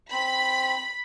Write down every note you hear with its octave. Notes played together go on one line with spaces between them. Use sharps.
C4 B5